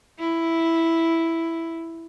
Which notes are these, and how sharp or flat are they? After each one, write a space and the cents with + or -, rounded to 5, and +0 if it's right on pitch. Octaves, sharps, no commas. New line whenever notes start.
E4 +0